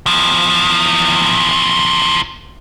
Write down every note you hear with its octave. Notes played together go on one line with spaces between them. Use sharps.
E2 F3